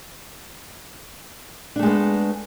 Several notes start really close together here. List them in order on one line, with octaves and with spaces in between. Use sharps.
D4 A3 G#3 B3